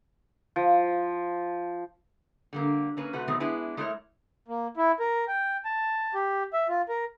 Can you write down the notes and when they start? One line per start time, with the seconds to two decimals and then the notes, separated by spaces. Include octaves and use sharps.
0.56 F3
2.53 D3 G3 A#3
2.97 A#3 C#4 B4
3.13 C3 A3 F#4 B4
3.28 B2 D#3 F#3 G#3 A3 C4
3.40 G#3 B3 D4 E4 G#4 B4
3.77 G#3 A3 E4 G#4 A#4 C#5
4.48 A#3
4.77 E4
5.00 A#4
5.28 G5
5.65 A5
6.14 G4
6.53 E5
6.69 F4
6.89 A#4